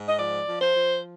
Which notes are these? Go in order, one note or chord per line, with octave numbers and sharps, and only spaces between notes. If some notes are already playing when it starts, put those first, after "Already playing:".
Already playing: G#2
D#5
F3 D5
F3
C5
F3